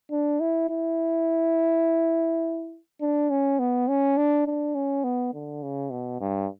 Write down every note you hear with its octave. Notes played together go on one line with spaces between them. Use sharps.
D4
E4
E4
D4
C#4
B3
C#4
D4
D4
C#4
B3
D3
C#3
B2
G2